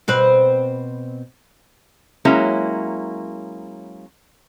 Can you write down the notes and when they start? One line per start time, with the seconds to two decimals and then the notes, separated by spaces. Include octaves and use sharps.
0.08 B2 C4 B4
2.25 F#3 G#3 A#3 C#4 E4